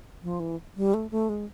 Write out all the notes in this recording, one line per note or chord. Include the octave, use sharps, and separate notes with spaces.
F3
E3
G3
A3
A3
G#3